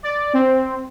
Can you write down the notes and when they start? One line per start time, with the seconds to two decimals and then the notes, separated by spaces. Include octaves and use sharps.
0.03 D5
0.33 C4